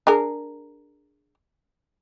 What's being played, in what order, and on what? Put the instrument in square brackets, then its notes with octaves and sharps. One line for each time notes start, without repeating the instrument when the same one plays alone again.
[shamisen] D4 G#4 A#4